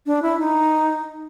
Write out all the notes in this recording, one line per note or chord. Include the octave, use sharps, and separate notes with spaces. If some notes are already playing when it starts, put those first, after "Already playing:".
D4
E4
D#4